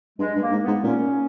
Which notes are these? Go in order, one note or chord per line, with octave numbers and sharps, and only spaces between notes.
G2 G#3
G2
A#3
G#2
G#2 B3
A#2 C#4